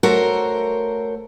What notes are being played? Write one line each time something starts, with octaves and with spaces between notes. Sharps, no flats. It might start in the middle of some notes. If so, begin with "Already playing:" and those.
A3 F#4 A#4 C5 C#5